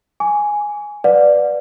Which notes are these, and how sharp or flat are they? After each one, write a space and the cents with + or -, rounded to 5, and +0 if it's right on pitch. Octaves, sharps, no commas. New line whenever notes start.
G#5 +0 D6 -45
B4 +0 D5 +5 F#5 -45